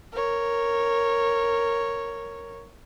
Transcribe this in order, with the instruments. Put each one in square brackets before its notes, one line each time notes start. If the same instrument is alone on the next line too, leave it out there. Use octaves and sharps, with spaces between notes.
[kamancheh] A#4 C#5